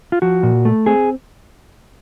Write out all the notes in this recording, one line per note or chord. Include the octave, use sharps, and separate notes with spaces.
F4
F3 F#4
A#2
A3
C4 G#4